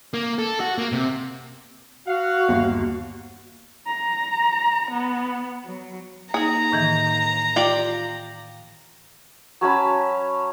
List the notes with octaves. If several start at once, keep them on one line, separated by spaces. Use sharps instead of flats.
A#3
A4
F#4
A#3
C3
F#4 F5 F#5
G1 D#2
A#5
B3
F#3
A#3 D#4 G#4 A#5
A2 D#3 E3
F4 G4 D5
F#3 C#4 A5 B5